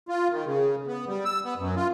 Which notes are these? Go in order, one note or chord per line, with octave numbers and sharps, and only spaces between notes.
F4
D#3
C#3
B3
G3
E6
B3
F#2
F4